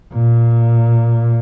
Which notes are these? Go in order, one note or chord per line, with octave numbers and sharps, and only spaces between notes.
A#2